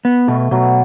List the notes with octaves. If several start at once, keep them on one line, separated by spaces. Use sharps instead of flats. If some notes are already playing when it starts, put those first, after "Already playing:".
B3
B2 A3
B2 F#3